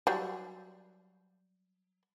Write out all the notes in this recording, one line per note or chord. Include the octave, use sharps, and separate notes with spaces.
F#3 G3